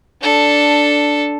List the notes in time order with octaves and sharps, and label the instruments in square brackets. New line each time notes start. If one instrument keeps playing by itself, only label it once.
[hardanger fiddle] D4 A4